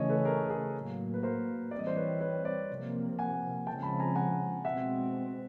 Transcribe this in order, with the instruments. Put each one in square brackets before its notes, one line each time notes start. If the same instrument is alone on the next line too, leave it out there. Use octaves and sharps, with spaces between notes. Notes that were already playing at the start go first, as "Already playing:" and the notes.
Already playing: [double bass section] C#3 E3 A3 C#4 [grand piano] C#5 D#5
[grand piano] A4 B4
G#4 A#4
G#4 A#4
[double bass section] A2 F#3 A#3
[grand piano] B4
A#4 C5
[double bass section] E3 G3 C4 [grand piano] D5
[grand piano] D#5
C5 D5
B4 C#5
B4 C#5
C5 D5
[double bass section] C3 F3 A#3
[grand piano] F#5 G#5
[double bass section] C#3 F3 G#3 C4 [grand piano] G5 A5
[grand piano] A5 B5
G#5 A#5
F#5 G#5
[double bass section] B2 G#3 C4 [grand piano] E5 F#5